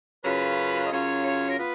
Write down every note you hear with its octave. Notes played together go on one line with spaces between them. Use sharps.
F#2 C#3 F#3 C#4 F4 B4
D#5
F#2 C#3 F#3 C#4 F4 C#5
C#5
A#4
B3 F4 B4